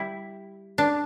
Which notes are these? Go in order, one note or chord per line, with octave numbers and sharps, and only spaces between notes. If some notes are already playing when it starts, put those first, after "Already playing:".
Already playing: G3 E4
D4